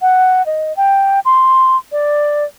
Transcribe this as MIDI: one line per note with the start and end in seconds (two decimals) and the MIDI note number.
0.02 0.45 78
0.46 0.75 75
0.77 1.20 79
1.25 1.77 84
1.92 2.44 74